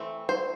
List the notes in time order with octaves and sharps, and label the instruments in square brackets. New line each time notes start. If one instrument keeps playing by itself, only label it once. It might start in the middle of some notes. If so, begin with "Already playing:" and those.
Already playing: [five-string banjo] E3 A3 C4
C5